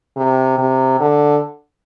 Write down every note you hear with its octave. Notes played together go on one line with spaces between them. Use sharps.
C3
C3
D3